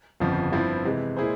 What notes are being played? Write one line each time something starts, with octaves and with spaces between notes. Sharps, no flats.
G1 F2 C#3 F3
G2 F3 C4 E4
C3 E3 G#3
A#2 G#3 E4 G#4 C5